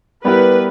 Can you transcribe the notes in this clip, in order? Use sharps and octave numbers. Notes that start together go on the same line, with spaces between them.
G3 B3 E4 G4 A#4 B4